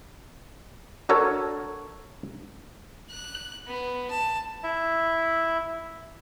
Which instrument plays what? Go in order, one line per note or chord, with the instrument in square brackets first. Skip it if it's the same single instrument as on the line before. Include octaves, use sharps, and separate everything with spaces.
[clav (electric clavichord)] D4 F#4 A4 A#4 C#5
[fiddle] F#6
B3
A5
[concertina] E4 E5